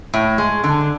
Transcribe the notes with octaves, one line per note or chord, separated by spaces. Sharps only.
A2
G#3
D3